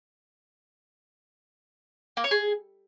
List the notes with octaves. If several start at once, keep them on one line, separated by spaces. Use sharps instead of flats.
A#3
C#5
G#4